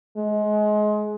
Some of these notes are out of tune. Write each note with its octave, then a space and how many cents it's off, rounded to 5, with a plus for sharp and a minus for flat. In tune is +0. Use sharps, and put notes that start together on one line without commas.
G#3 +25